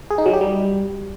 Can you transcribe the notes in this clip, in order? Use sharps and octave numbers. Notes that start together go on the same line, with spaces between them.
G#4
D#4
F#3
G4
G3